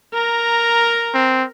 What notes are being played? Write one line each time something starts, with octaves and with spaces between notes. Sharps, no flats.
A#4 A#5
C4